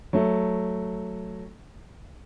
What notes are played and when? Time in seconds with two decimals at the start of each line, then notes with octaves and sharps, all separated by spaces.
0.13 F#3 A3